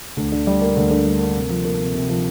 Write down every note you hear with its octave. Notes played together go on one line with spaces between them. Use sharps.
D2
D3
G3
A#3
D2
D3
G3
A#3
C3
F3
A#3
C3
C3
F3